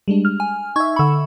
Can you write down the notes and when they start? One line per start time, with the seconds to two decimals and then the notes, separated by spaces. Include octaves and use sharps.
0.08 G3 G#3 D4
0.25 F6
0.40 G#5
0.76 D#4 E5 C#6 G#6
0.96 D3 B5 C#6 E6